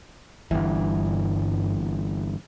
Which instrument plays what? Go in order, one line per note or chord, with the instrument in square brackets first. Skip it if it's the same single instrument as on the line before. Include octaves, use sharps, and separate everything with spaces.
[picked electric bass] G1 C#2 E3 [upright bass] G2